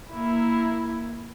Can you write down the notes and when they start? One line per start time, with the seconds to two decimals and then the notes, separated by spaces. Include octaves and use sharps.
0.13 A#3 E4